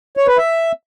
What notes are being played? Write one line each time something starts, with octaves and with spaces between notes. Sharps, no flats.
C#5
B4
E5